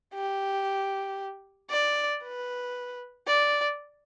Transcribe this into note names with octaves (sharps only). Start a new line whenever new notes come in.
G4
D5
B4
D5